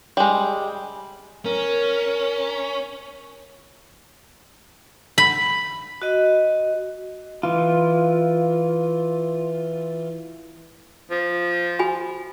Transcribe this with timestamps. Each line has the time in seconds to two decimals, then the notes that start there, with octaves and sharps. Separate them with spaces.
0.17 G3 G#3
1.46 C#4 A#4
5.18 B5
6.02 F#4 D#5
7.43 E3 F4
11.11 F3
11.79 F#4 G#5 B5